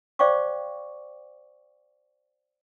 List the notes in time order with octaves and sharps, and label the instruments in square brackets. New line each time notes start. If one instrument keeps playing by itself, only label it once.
[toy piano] C5 D5 F5 G5 C#6 D6